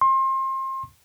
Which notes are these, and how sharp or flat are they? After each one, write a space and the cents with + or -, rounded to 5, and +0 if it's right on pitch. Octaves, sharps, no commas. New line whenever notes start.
C6 +30